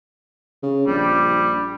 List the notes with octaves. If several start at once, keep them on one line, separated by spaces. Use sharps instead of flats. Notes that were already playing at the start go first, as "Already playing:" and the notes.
C#3
A#1 G3